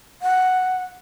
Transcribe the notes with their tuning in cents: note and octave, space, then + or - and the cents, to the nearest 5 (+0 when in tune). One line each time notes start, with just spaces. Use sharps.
F#5 +0